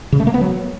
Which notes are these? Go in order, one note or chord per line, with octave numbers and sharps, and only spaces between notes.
C#3
A3
A#3
B3
F#3